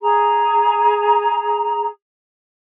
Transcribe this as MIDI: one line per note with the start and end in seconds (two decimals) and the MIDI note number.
0.01 1.88 68
0.01 1.88 82